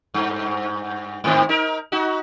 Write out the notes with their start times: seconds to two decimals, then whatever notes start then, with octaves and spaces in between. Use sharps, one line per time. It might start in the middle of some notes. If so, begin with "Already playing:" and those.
0.14 G2
1.24 G#2 D#3 C4
1.49 D#4 A#4
1.92 D#4 F#4